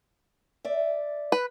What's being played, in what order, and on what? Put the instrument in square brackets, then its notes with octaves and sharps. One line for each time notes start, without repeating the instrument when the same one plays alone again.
[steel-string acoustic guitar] D5 E5
[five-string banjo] B4